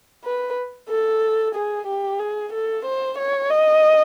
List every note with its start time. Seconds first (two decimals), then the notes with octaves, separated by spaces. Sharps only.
0.24 B4
0.89 A4
1.55 G#4
1.87 G4
2.19 G#4
2.52 A4
2.85 C5
3.18 C#5
3.50 D#5